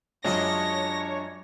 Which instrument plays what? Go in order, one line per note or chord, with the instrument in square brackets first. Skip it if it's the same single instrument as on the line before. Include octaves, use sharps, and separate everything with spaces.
[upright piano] F#2 G#3 F4 [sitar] D4 D#5 [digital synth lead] C#5 [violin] A#6